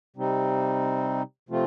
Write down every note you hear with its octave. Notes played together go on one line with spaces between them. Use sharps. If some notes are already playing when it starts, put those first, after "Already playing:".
C3 G3 C4 D#4
C3 F3 A3 C4 F4